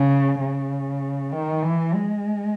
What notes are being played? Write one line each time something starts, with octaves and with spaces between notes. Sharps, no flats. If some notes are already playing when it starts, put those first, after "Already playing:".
Already playing: C#3
C#3
D#3
E3
G#3